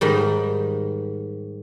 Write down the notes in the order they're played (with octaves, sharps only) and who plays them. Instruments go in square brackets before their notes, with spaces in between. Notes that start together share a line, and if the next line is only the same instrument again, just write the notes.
[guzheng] G#2 D#3 G3